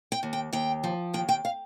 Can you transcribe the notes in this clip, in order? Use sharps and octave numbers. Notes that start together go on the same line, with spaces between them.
G5
D#2
G5
D#2 G5
F3
D#2 G5
G5
F5